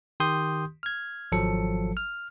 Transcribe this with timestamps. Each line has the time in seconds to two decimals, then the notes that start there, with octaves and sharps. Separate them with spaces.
0.20 D#3 G4 C6 D#6 G6
0.83 F6 G#6
1.32 G#1 F3 F#3 A4 C#7
1.97 F6